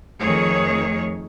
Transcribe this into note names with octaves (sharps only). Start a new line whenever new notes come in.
F2 D#3 A3 G#4 C#5